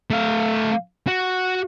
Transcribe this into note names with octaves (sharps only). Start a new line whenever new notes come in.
A3 F5
F#4